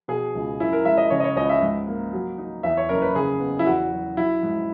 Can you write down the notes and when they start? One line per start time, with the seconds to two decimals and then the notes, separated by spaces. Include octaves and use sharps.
0.08 B2 G#4
0.35 C#2
0.60 F#2 E4
0.73 A#4
0.85 G#3 E5
0.97 D#5
1.10 C#3 C#5
1.20 D#5
1.24 C#5
1.36 C#2 D#5
1.49 E5
1.62 G#2
1.87 A#3
2.13 F#3
2.38 D#4
2.63 E2 E5
2.77 C#5
2.89 F#1 A#4
3.02 B4
3.15 C#3 G#4
3.40 B3
3.59 E4
3.66 E2 F#4
3.92 F#3
4.17 F#3 E4
4.43 G#2